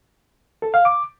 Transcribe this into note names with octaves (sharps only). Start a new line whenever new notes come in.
A4
F5
D6